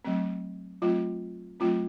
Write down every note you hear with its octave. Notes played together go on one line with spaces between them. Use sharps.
F#3 A3 C4
F#3 A3 C4 F4
F#3 A3 C4 F4